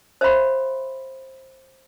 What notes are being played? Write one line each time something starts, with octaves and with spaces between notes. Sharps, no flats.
C5 E5 F5 B5 C6